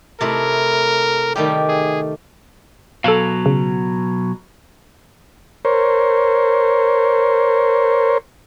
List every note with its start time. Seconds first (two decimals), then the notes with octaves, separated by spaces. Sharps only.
0.21 C3 A3 E4 A#4
1.36 D#3 G3 A3 G4
1.68 G#4
3.04 B2 F#3 A4 F5
3.46 C#3
5.65 A#4 C5 C#5